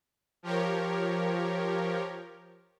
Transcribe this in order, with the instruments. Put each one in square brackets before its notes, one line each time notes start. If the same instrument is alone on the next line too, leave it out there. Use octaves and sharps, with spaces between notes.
[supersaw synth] F3 G4 A#4 C#5